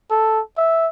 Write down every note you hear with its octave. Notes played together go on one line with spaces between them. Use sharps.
A4
E5